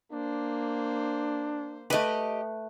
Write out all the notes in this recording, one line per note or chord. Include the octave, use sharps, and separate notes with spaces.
A#3 D4 C5
A3 G4 B4 D#5